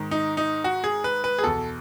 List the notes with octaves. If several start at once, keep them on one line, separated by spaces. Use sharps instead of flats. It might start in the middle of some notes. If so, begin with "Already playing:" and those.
Already playing: G#2 D#3
D#4
D#4
F#4
G#4
B4
B4
G#4
E2 B2 A4